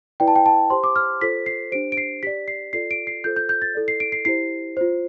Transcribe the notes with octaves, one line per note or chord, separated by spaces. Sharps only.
E4 B4 D5 G5
A5
G5
A5
G4 C5 C6
D6
F6
F4 A4 C5 B6
C7
D4 G4 C5 D7
D7
C7
G4 D5 B6
C7
F4 A4 D5 C7
D7
C7
F4 A4 C5 G6
G6
G6
A6
E4 A4 D5
C7
D7
C7
E4 G4 C5 C7
F4 C5